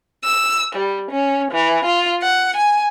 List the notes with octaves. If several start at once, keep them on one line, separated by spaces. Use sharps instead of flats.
E6
G3
C#4
E3
F4
F#5
G#5